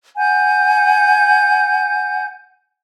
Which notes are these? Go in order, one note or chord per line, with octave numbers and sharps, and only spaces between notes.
F#5 G#5 G6